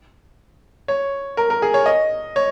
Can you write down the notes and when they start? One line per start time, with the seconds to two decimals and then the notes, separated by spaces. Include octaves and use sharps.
0.88 C#5
1.37 A#4
1.50 A#4
1.62 G#4
1.74 C#5
1.86 D#5
2.36 C#5